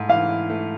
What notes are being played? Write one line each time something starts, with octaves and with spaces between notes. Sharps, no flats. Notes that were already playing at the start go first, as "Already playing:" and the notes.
Already playing: G#2 A3 E4
E3 F5
E4
A3